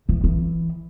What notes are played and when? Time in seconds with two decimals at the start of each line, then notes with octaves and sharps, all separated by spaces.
0.09 E3
0.24 E3